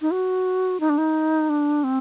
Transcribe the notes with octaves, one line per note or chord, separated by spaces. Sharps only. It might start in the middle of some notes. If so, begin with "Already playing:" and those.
D#4
F#4
D#4
D4
D#4
D4
C4